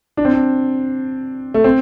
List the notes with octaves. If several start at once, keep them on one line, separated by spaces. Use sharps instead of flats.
D4
C4
D4
A3
C4